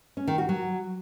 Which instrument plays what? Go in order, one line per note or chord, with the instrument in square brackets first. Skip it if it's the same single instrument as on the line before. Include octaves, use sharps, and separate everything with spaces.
[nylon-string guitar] C#4
D#3
F#4
F#3